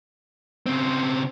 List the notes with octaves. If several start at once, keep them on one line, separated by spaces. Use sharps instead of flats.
C#3 C4